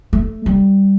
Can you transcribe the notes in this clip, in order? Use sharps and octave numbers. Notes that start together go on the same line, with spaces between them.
A3
G3